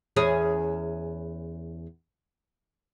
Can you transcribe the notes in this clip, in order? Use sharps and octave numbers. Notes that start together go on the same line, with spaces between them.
E2 C#4 G#4